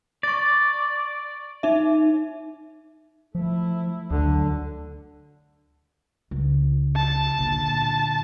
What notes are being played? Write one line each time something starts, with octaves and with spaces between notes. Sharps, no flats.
D5 C#6 A6
D#4 E5
F3 A3 E4
D2 D3 F#3
C#2
A5
A#2 D3